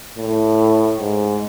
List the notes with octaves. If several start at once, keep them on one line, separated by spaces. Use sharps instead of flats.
A2
G#2